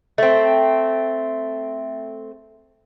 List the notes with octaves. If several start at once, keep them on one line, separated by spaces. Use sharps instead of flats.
A3 C4